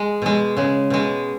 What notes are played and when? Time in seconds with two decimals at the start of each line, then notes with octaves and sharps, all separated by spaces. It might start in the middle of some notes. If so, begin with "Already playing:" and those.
Already playing: G#3
0.22 B2 G#3
0.57 C#3 G#3
0.90 B2 G#3